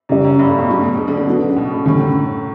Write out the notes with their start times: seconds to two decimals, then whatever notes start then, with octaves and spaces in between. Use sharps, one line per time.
0.09 F#2 C#3 G3 C#4 G4 D5
0.24 F#2
0.39 G2
0.49 A2
0.58 B2
0.68 C#3 F#3 A3 D4
0.82 B2
0.97 C#3
1.08 D3
1.17 C#3
1.27 F#3 B3 D4 F#4 A4
1.49 C#3
1.56 B2
1.71 A2
1.85 A2 D3 G3 C#4
2.01 F#2